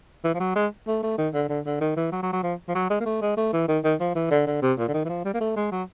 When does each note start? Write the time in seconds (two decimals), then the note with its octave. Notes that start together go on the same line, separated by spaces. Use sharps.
0.24 E3
0.34 F3
0.40 F#3
0.56 G#3
0.87 A3
1.03 A3
1.18 D#3
1.34 D3
1.49 D3
1.65 D3
1.81 D#3
1.97 E3
2.12 F#3
2.23 F#3
2.33 F#3
2.43 F3
2.68 F3
2.75 F#3
2.90 G#3
3.00 A#3
3.06 A3
3.22 G#3
3.37 A3
3.53 E3
3.68 D#3
3.84 D#3
4.00 F3
4.15 E3
4.31 D3
4.47 D3
4.62 C3
4.78 A#2
4.88 D3
4.94 D#3
5.05 E3
5.09 F3
5.25 G3
5.34 A#3
5.41 A3
5.56 G#3
5.72 F#3